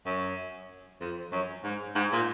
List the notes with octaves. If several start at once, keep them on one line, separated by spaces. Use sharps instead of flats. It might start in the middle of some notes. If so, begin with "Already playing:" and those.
F#2
F2
F#2
G#2
G#2
A#2